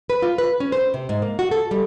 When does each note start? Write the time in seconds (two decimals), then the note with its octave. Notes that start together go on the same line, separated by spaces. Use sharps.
0.10 B4
0.22 F4
0.38 B4
0.60 C#4
0.72 C5
0.94 C3
1.09 G#2
1.22 A#3
1.39 F#4
1.51 A4
1.71 G3